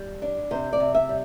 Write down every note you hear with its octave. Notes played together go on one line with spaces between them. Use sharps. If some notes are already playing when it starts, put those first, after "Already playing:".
Already playing: G3
D4
C3 C5
D5
C3
E5
G3